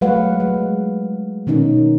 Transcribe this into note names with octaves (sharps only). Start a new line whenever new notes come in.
F#3 G#3 A3 B4 F5 F#5
G#3
B2 D#3 C#4 D#4